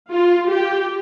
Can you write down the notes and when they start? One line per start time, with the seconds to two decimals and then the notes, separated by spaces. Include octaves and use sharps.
0.11 F4
0.48 G4